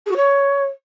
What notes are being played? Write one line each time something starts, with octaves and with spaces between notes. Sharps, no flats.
G#4
F#4
C#5